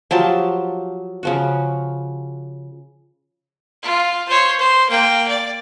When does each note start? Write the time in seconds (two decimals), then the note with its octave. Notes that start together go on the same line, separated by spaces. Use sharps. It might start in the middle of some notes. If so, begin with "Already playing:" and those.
0.11 F3 F#3 G4 A5
1.23 C#3 F3 F#4
3.82 F4
4.29 C5 C#5
4.59 C5
4.90 A#3 G5
5.28 D5